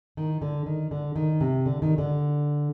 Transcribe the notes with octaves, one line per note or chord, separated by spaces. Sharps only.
D#3
D3
D#3
D3
D#3
C3
D3
D#3
D3